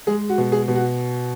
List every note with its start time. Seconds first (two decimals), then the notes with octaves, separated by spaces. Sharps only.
0.07 G#3 G#4
0.29 F#4
0.38 B2
0.52 G#4
0.68 B2
0.76 F#4